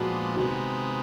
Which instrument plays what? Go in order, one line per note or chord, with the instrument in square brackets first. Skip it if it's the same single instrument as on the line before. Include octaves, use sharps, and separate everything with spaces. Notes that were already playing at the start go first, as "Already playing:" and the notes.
Already playing: [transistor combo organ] A#2 F3 G#3 B3 D4 [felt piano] F#4
[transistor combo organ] C3 D#3 G#3 B3 [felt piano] F#4